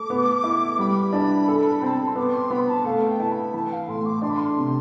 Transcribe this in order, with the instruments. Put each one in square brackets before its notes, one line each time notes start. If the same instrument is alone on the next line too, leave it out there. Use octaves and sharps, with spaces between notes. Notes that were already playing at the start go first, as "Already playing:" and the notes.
Already playing: [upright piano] A3 [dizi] D6
[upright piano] B3
E4
[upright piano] G3 [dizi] B5
[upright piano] D4
A4
[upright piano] C4 [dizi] A5
[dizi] B5
C6
[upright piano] B3 [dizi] D6
[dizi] C6
[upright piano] B3 [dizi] B5
[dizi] A5
[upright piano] A3 [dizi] F5
[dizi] G5
[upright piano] E4 [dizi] A5
[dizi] B5
[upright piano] E3 [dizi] A5
[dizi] F5
[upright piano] A2 [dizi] C6
[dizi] D6
[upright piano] D4 [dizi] C6
[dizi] B5
C6
[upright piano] C3